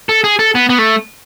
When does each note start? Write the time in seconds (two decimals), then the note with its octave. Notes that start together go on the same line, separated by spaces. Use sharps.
0.09 A4
0.24 G#4
0.39 A4
0.55 B3
0.70 B3
0.79 A3